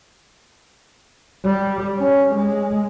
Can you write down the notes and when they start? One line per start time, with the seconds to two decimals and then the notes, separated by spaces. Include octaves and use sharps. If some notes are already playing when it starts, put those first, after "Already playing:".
1.44 G3
1.98 C#4
2.35 G#3